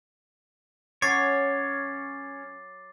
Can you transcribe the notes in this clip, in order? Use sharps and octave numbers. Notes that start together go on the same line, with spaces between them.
F#3 C#4 C#5 D6 A6 C7